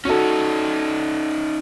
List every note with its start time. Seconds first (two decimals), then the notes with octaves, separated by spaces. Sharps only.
0.05 C#4 D#4 F#4 A4